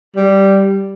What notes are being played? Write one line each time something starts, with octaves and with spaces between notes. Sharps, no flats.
G3